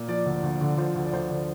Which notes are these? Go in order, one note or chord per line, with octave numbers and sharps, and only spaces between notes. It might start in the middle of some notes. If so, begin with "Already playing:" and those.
Already playing: A#2
F3 D5
D2
D2
D3
F3 C5
D2
D5
D2 C5
D3